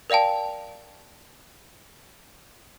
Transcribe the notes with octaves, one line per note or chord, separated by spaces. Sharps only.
A#4 D5 F5 G5 A5